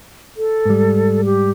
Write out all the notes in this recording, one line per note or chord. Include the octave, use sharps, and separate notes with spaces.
A4
G#2 G3
G4